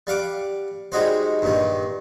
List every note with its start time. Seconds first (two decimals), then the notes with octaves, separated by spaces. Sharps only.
0.07 G3 F5 F#5 D6
0.92 G3 G#3 D#4 F#4 C5
1.42 G2 A#2 D#3